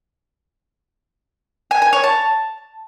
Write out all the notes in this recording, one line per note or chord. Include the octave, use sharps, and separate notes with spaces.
G#5
G#5
C#5
A5